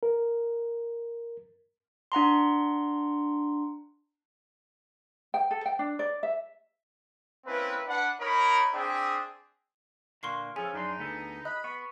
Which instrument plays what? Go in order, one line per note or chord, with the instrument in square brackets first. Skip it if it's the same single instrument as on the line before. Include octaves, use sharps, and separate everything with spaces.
[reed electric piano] A#4
[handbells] D4 F#5 A#5 C6
[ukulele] G5
A4
G5
D4
D5
E5
[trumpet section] A#3 C4 C#4 E4 B4
D4 B4 F#5
D#4 A#4 C#5 A#5 B5
C4 D4 G#4 C5 E5 G5
[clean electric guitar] A#2 D3 A#3 [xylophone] C6 C#6 C7
[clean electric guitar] F3 C#4 [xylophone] G#4 G#5 [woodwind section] A4
[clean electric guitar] F#2 D4 C6 [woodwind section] D#4
[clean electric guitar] D2 B3 A4
[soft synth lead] D#5 [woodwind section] B5 [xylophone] F#6
[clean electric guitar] B3 [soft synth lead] C#6